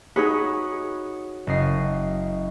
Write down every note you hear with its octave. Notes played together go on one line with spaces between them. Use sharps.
D#4 F#4 G#4 B4 C#5 D#6
F#1 D#5 C7